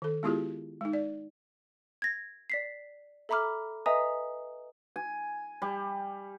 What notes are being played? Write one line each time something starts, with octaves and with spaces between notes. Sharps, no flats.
D#3 A4
G#3 B3 E4 F4 G4 G#4
G#3 D#4
D5
G#6 A#6
D5 B6 C7
A4 E5 A#5 B5 D6 F6
B4 D#5 E5 G#5 A#5 D#6
G#5
G3